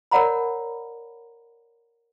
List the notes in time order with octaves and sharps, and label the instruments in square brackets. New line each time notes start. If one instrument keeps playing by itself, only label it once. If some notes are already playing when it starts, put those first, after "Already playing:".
[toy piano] A#4 C#5 D5 F#5 A#5 B5